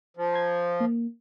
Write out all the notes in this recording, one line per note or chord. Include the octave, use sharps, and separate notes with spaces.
F3
A#5 C6 G#6
A#3